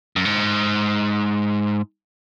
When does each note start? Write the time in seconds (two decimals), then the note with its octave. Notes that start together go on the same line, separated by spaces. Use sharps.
0.16 F#2
0.25 G#2